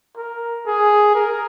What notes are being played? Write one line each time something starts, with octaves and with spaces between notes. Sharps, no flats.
A#4
G#4
A#4